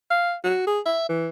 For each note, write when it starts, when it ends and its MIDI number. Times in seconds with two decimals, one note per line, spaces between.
0.10 0.34 77
0.44 0.67 66
0.67 0.80 68
0.86 1.05 76
1.09 1.29 52